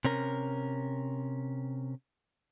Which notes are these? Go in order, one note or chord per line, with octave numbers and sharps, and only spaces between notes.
C3 C#4 A#4